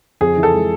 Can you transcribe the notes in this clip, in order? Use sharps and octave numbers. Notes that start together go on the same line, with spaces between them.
F2 G#4
E3
A4
G#3